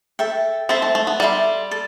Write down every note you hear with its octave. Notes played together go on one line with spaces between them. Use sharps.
A4 E5 G5
C4 A4 E5 A5 C6
A3
A3
B3
G3 A4 E5 A5 C6
A4